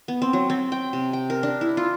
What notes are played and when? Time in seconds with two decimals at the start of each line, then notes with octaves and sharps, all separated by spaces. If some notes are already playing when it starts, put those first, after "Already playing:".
0.08 B3
0.22 C4
0.33 F#3
0.50 C4
0.72 G5
0.93 C3
1.13 G5
1.30 A#4
1.43 D4
1.61 E4
1.77 F4